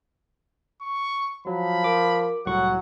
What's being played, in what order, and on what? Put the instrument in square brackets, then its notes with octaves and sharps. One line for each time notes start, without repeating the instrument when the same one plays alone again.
[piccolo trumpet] C#6
[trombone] F3 [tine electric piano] F#3 [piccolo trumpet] B5
[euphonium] A#4 [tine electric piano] D6
[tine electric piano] C2 A2 C#6 [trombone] F#3 [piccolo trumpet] F#5